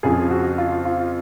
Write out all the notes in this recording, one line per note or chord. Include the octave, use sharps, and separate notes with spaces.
F2 C#3 F3 G#4
F#4
F4
F4